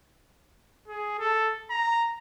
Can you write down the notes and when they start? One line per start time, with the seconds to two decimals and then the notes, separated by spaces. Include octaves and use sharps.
0.88 G#4
1.19 A4
1.70 A#5